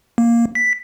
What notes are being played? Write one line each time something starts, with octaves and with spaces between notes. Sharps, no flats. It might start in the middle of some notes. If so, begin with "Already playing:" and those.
A#3
B6